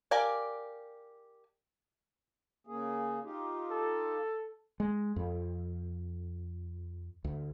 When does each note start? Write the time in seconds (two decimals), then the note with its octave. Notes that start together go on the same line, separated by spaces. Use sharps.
0.11 G4 A#4 D5 F5 G#5
2.67 C#3 A#3 G#4
3.24 D#4 F4 G4
3.70 A4
4.80 G#3
5.16 F2
7.24 D2